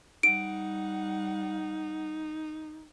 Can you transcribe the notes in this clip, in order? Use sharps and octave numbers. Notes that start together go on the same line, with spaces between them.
G3 D#4 F#5 D7